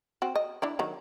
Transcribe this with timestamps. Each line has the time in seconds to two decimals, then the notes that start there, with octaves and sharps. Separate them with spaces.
0.22 C4 F#4
0.35 D#5
0.62 D4 E4 D5
0.79 D#3 F#3